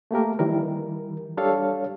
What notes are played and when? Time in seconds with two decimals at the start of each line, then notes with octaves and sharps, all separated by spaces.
0.11 A3 A#3 G4 A#4
0.39 D#3 E3 G3 A#4
1.37 G3 D4 G4 A4 C#5 F5